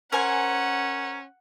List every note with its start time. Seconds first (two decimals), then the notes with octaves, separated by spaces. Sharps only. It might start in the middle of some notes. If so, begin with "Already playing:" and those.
0.12 C#4 A#4 C5 F#5 G#5